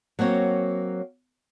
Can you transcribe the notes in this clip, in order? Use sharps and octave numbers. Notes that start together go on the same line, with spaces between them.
F#3 A#3 C4 C#5